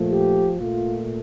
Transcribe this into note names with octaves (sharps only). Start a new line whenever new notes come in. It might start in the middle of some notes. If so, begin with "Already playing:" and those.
Already playing: A#2 F3 A3
G4
A#2 A3 F4